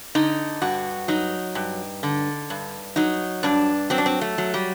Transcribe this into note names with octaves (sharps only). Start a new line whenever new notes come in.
D3 D#4
G2 F#4
F#3 D#4
G2
D3
G2
F#3 D#4
G2 D4
F#3 C4
D4
C4
A3
F#3
G3